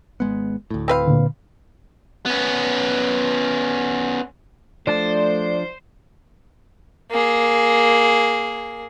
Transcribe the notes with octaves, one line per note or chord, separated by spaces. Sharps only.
G#1 G#3 B3
D2 A2
C4 B4 F5
A#2 D3
B3 C#4
F3 A3 D4 C5 D5 A5
A#3 G#4